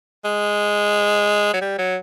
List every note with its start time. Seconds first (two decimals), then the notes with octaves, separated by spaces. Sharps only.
0.25 G#3
1.53 F#3
1.61 G3
1.78 F#3